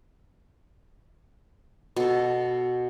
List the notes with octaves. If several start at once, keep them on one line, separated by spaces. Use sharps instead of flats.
B2 A4